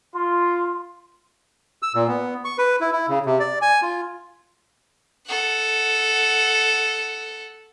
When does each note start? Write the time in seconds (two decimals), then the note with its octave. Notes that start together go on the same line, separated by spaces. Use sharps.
0.14 F4 C6
1.82 E6
1.95 A#2
2.08 B3
2.45 C#6
2.58 B4
2.81 E4
2.92 E4
3.08 C#3
3.26 C3
3.40 D5
3.62 G#5
3.82 F4
5.28 A4 F#5